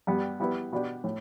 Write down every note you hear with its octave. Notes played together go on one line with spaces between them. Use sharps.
G2 G3 B3
G3 B3 E4 B4
B2 B3 D4 G4
A2